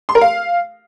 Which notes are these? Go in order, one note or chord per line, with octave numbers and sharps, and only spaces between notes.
C6
A#4
F5